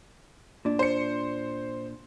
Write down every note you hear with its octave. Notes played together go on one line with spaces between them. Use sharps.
A#2 D4
C5 C#7